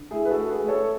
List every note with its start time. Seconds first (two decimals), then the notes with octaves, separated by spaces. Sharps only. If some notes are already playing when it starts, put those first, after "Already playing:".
Already playing: D3
0.11 A3 E4 G#4
0.25 B4
0.30 F#4 A4
0.36 A3
0.49 G#4 B4
0.62 A3
0.68 A4 C#5